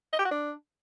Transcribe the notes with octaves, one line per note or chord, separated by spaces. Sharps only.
D#5
G4
F#4
D4